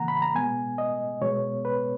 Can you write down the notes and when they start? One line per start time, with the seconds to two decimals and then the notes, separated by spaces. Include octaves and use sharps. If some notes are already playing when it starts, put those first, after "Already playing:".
Already playing: C#3 E3 A#3 F#5 A#5
0.08 B5
0.22 A#5
0.35 B2 G#3 B3 G#5
0.78 D#5
1.21 B2 G#3 B3 C#5
1.65 B4